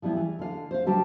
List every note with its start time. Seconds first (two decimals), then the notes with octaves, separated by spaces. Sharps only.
0.02 F3 G3 B3 E4 F4
0.16 E3
0.39 D3 F5
0.71 C5 F5
0.86 D3 G3 F#4 G4 B4 A5